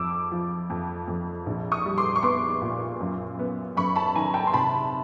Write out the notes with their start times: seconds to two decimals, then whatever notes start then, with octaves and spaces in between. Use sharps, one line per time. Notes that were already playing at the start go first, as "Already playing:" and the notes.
Already playing: F2 D6 E6
0.32 F3
0.70 F2
1.08 F2
1.46 A#1
1.72 C#6 D#6
1.86 G3
1.98 C6 D6
2.16 C#6
2.23 B3 C6 D6
2.61 A#2
3.01 F#2
3.39 B3
3.77 F#2 B5 C#6
3.96 A5 B5
4.15 D#3 G#5 A#5
4.34 G5 A5
4.47 C6
4.53 C3 A5 B5